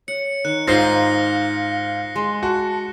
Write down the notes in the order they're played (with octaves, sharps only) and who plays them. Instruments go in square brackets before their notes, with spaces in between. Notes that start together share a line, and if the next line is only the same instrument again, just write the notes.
[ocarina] C#5 [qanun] F#5 [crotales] C#7
[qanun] D#3 [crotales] F#6 C#7
[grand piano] G#2 F4 C5 [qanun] D#4 [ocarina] F5 [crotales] A#6 C7 G7
[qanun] G#3 [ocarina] C6
[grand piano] F#4 [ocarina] A5